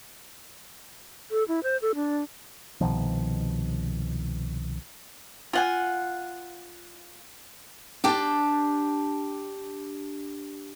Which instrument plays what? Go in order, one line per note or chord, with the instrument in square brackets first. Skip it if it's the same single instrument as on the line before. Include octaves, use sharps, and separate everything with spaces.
[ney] A4
E4
C5
A4
D4
[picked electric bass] C2 B2 D#3 F3
[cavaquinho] F4 F#5 G#5
[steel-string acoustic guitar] D4 G4 G5 A5